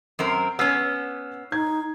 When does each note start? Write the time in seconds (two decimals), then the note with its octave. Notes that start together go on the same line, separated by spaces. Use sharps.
0.19 F#2 C4 A#4
0.59 B3 C#4 E6 F6 C7
1.52 D#4 G#6